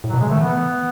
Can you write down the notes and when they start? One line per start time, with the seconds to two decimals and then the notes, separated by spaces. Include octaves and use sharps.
0.04 A2
0.09 B2 F#3
0.20 C#3 G#3
0.29 D#3 A3
0.41 E3 B3